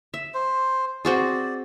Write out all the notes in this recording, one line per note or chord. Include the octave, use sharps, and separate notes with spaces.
E5
C5
C4 F#4 G#4 D5